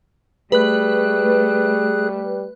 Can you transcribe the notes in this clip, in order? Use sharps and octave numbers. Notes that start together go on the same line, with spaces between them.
G3 A3 G#4 B4 F#6